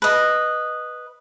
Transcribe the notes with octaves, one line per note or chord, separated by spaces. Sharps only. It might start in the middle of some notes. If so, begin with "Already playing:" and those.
B4 D#5